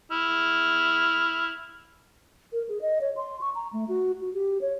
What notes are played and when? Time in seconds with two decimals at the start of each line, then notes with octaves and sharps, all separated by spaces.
0.12 E4 F6
2.52 A#4
2.69 G#4
2.81 D#5
3.01 C#5
3.16 C6
3.41 C#6
3.55 A#5
3.73 A3
3.88 F#4
4.21 F#4
4.34 G4
4.61 C#5